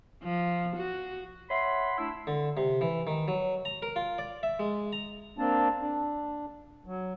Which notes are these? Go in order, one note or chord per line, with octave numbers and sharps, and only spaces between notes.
F3
F#4
C#5 E5 F#5 B5 C6
A3 D4 E4 E6
D3
C3
E3
D#3
F#3
A#5
A#4
F4
D5
E5
G#3
A#5
A#3 C4 D4 A5
D4
F#3